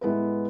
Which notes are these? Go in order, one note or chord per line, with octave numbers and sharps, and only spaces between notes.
A2 G#3 B3 E4 B4